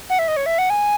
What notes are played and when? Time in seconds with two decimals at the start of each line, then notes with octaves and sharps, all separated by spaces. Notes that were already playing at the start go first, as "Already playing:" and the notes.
0.10 F#5
0.19 E5
0.28 D#5
0.37 C#5
0.46 E5
0.58 F#5
0.70 G#5